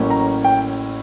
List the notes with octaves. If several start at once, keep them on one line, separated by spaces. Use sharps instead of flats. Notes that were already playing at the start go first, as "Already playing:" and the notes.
Already playing: A1 A2 F#3 A#3 C#4
A#5
G5